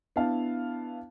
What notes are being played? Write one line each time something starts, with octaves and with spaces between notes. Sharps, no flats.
B3 D4 E4 F5 A5